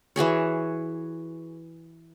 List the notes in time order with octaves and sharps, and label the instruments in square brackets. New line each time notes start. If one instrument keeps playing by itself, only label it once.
[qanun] E3 F#4 G#4 C#5